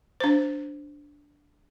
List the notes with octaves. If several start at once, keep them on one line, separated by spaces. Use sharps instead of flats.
D4 C5